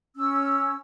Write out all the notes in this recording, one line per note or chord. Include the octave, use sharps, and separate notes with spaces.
C#4 E6